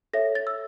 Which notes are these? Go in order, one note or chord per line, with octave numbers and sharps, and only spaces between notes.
A4 C#5 E5 A#6
A6
E6